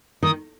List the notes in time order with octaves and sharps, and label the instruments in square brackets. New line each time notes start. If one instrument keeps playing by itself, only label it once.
[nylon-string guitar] D#3 [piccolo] D#6